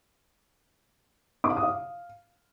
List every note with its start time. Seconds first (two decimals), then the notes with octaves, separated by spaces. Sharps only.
1.44 D6
1.50 F5
1.56 D#6
1.63 F5